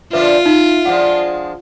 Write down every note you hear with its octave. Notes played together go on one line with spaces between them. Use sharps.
D3 F3 D4 F4 B4 E5
D#4 E4
F3 G#3 D4 F#5